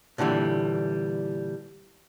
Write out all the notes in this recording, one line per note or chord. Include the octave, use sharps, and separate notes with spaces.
A#2 D3 E3 G3